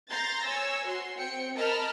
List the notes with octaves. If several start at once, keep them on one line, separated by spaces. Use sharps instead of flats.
A#5 C6 G6 A6 A#6
C#5 G#5 E6
F#4 C6
C4 G5 C#7
A#4 D#5 A5 B5 F6